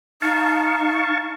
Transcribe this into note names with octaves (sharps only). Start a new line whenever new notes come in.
D#4 F5 A5 C#6